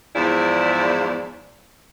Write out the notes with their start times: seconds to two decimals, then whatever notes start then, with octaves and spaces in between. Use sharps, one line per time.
0.16 E2 G#2 F3 E4 D5